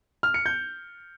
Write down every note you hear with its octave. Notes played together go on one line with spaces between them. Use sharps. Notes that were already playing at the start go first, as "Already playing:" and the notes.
F6
C#7
G6